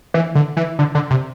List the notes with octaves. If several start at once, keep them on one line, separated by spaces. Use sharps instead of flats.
E3
D3
E3
D3
D3
C3